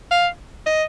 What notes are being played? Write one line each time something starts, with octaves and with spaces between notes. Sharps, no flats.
F5
D#5